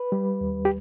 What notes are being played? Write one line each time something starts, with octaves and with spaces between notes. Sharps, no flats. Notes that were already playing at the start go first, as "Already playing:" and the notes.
Already playing: B4
G3
D#2
G4